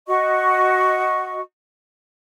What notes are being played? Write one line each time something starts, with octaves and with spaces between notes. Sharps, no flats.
F#4 D#5 C#6